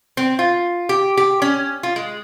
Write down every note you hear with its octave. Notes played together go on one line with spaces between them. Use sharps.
C4
F4
G4
G4
C#4
F4
G#3